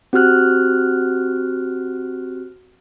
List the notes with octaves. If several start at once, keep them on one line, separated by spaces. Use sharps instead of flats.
C4 F#4 G4 F6 F#6